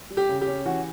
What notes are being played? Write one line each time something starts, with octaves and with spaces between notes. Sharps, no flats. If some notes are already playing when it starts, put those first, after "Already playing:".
G3
G4
C#3
G4
C#4
E3 F#4